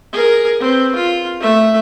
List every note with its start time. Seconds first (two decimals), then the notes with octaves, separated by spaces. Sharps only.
0.13 G#4 A#4
0.60 C4 B4
0.96 F4
1.41 A3 E5